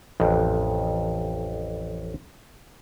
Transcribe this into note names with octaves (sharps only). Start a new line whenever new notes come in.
A1 F2